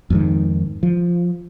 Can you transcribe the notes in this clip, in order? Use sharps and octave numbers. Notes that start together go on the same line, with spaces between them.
F2 G#2 D#3
F3